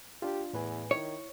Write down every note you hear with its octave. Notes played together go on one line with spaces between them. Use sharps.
D4 F4 G4
E2 A2 B4 G#5
D#3 E4 C#5